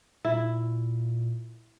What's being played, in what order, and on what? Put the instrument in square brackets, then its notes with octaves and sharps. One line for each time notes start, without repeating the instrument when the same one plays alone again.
[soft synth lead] A#2 [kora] E4